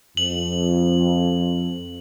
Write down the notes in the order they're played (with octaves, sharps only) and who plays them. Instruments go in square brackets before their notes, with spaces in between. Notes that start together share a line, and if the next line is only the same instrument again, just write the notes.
[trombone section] F2 [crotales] F#7